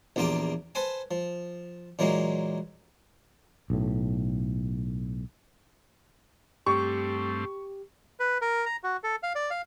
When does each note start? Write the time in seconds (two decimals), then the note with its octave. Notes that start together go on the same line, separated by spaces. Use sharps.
0.16 A#1 E2 A#3 F4 G4 G5
0.75 A4 B4 C5 G#5
1.11 F3
1.99 A#2 E3 F#3 G#3 A#3
3.70 B1 A2
6.66 G2 A3 C4 G4 C#6
8.20 B4
8.41 A#4
8.66 A#5
8.84 F#4
9.04 A4
9.23 F5
9.35 D5
9.50 F5